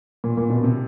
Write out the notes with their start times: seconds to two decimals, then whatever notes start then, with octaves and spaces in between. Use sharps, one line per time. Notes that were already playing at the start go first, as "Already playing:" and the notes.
0.24 A#2
0.37 A#2
0.50 B2
0.64 C3